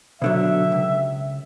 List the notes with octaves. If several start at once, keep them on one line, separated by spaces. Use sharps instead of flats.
B2 D3 F#3 E5
C#2